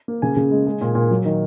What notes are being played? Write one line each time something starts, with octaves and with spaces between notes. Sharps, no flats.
A#3
C#3 G#5
C#3
G#3
G#3
A#2
A#2
F#3
D#3